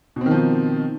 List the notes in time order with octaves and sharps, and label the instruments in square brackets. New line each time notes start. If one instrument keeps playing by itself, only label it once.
[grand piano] B2
C4
D#3
F3